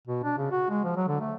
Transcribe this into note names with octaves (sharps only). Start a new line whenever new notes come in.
B2
D4
C#3
F#4
G#3
F3
F#3
D3
A3